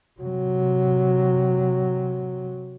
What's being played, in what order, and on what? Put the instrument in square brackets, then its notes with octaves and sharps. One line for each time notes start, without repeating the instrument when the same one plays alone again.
[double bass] C3 F#3